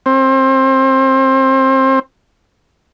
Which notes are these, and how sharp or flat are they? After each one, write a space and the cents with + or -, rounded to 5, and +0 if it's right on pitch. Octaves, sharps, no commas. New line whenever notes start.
C4 +25